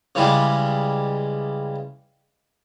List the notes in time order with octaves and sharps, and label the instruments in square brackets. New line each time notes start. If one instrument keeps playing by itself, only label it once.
[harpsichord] C#3 E3 G3 G#3